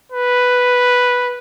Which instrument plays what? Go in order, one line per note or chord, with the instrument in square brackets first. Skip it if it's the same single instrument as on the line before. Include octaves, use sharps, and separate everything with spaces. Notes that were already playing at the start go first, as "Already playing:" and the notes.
[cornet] B4